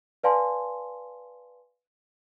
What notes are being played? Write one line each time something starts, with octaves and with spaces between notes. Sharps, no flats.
B4 D5 F5 G#5 A5 C6